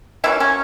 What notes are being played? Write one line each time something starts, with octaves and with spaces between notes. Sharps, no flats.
B2 E3 F#3 A#3 C#4 E4
C#4